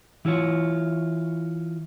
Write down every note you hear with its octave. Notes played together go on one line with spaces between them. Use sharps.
E3 E4 F4 C#5